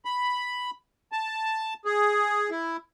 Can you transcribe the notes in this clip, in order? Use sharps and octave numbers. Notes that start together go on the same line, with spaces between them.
B5
A5
G#4
E4